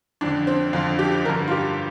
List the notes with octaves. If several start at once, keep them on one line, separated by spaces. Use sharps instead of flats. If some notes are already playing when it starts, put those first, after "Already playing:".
F2 D3 D4
C4
F2 D3 F4
G4
G2 D3 A#4
F4
G4